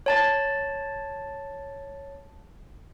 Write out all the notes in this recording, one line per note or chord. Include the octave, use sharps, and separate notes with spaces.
C#5 A5 A6